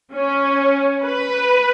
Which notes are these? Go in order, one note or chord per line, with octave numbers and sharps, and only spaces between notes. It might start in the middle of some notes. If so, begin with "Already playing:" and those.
C#4
B4